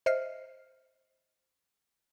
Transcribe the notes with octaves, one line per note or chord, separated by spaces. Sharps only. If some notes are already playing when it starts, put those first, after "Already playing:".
C5 D#5 E5 F6 C7